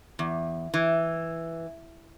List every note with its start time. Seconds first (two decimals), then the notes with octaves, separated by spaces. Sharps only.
0.19 E2
0.74 E3